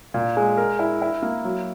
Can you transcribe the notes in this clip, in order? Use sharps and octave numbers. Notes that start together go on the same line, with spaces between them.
A#2
G#3
A#4
E4
E4
A#3
F#3